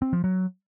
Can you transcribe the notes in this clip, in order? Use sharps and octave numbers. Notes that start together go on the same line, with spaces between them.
C4
F3
F#3